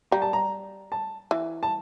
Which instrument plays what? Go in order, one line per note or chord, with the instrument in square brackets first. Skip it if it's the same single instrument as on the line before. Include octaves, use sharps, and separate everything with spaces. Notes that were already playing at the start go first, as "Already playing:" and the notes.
[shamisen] G3 [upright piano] A#5
[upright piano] A5
A#5
A5
[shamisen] E3
[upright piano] A5